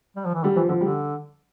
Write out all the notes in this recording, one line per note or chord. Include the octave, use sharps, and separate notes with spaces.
G3
F3
E3
D3 G3
E3 F3
D3 F3
D3 G3